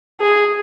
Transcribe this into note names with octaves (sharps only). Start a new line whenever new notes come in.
G#4